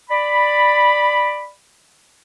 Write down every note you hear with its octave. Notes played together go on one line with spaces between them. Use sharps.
D5 B5